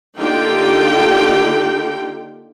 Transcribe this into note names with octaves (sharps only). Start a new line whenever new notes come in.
D3 A#3 D#4 F4 G4 G5